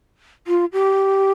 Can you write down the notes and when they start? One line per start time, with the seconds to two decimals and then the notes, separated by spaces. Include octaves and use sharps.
0.47 F4
0.73 G4